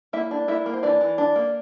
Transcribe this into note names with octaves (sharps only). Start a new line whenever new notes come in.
A#3 E4 E5
D4
A#3 E4 E5
A#3
C5
E3 D4 D5
E3
D4
A#3